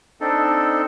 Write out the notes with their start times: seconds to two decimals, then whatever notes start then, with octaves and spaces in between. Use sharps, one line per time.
0.21 C4 D4 D#4 A4